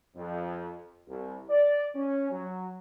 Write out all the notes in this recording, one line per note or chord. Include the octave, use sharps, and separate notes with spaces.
F2
C2
D5
C#4
F#3